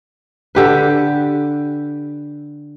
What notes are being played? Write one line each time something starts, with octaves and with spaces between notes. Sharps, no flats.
D3 G4 B4